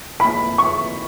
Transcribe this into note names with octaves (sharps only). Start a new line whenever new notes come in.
B5
C#6